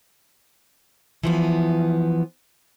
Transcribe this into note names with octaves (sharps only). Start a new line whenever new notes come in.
E3 F3 B3